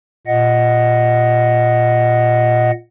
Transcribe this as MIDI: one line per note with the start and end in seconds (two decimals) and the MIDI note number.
0.27 2.71 46
0.27 2.71 75
0.27 2.71 78